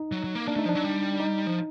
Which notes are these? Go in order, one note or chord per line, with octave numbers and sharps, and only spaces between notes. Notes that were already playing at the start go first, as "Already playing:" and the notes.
Already playing: D#4
F#3
F#3
A#3
A#3 D4
A3 D#4
F3 D4
F#3
G3
D#4
F3